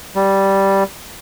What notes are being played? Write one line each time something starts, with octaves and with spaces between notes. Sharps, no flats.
G3